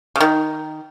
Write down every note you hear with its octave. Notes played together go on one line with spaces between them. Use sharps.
C#3
D#3